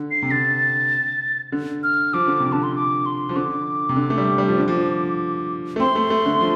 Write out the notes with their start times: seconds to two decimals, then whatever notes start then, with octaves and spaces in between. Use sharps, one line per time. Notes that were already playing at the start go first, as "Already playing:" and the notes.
Already playing: D3
0.11 C7
0.22 C3
0.31 D3 A6
1.52 D3
1.83 F6
2.14 F3 D6
2.27 D3
2.40 C3
2.52 D3 A5
2.63 C6
2.75 D6
3.06 C6
3.29 F3
3.36 D3 D6
3.89 C3
3.96 D3
4.10 A3
4.18 G3
4.38 G3
4.48 F3
4.58 D3
4.68 F3
5.76 A3
5.80 C4 C6
5.95 A3
6.10 A3
6.26 D3
6.41 F3